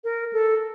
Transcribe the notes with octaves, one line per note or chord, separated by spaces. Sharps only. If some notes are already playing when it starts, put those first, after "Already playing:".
A#4
A4